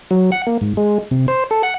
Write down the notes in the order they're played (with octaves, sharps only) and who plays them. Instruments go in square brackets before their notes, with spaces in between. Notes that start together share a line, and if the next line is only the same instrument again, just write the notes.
[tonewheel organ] F#3
F#5
A#3
G#2
G#3
C3
C5
A4
F#5